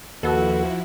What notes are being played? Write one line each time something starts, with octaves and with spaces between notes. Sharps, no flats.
D#2 F3 E4 F#4 A4 B4